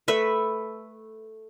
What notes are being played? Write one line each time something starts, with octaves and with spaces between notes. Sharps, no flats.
A3 B4 E5